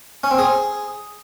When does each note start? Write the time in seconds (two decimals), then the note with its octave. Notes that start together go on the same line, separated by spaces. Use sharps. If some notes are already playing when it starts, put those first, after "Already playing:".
0.24 C#4
0.31 C4
0.38 G#4